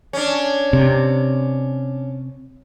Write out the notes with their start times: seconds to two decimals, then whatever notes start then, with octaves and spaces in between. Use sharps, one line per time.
0.13 C#4 D4
0.73 C3